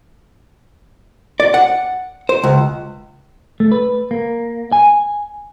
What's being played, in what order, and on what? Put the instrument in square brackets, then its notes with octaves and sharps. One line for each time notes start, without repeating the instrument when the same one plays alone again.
[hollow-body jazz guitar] D5
F#5
C5
C#2
[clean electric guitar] A3
B4
A#3
G#5